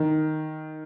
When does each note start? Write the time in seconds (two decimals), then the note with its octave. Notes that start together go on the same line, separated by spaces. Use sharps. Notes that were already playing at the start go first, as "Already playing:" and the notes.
Already playing: D#3